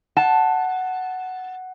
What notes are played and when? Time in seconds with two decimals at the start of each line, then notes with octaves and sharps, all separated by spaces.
0.17 F#5 A5